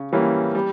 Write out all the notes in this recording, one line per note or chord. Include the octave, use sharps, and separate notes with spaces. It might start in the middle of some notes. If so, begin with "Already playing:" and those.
Already playing: C#3
E3 G3 A#3 C#4
G3